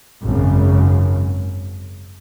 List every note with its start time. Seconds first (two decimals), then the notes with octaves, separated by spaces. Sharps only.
0.23 G#1 F#2 C#3